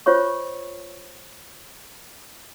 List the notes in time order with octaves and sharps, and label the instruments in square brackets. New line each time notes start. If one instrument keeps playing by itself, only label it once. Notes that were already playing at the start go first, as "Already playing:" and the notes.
[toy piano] F4 C5 C#5 C#6